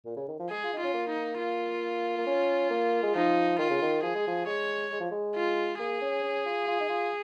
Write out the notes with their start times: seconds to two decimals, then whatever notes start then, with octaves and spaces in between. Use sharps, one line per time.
0.05 A#2
0.16 C#3
0.28 D#3
0.39 F3
0.50 G#3 G#4
0.64 F4
0.73 D#4
0.79 C#4 F4
0.94 A#3
1.09 D#4
1.38 F4
2.18 A#3
2.26 C#4
2.70 A#3
3.03 G#3
3.15 F3 D#4
3.58 D#3 F4
3.70 C#3
3.81 D#3
4.03 F3 G#4
4.15 G#3
4.27 F3
4.46 G#3 C#5
4.91 G#3
5.00 F3
5.11 G#3
5.35 F4
5.79 A#3 G#4
6.01 C#4
6.23 C#4
6.45 F4
6.67 F4
6.80 D#4
6.89 F4